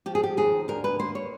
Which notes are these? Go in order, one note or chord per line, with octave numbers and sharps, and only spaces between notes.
F3 G4
G#4
G4
D#2 G#4
D2 A#4
B4
A#3 C5
C#5